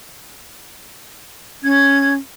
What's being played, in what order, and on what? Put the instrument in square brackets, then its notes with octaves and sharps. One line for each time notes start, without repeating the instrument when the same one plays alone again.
[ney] C#4 [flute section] G#6